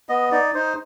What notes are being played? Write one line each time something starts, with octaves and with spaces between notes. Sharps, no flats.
B3 D#5
D#4 D5
D#4 C5